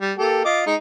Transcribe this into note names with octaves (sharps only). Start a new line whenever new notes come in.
G3
A#3 G4 A4
F4 D#5 D6
G#3 D#4